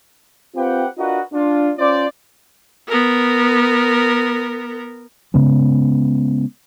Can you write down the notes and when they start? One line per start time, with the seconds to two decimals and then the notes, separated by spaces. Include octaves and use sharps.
0.56 C4 F4 G4 B4 F#5 G5
0.97 D4 F4 F#4 A#4 B4 D#5
1.33 D4 F4
1.78 C#4 F4 C5 D5
2.88 B3 A#4
5.34 C#3 G#3 B3 C#4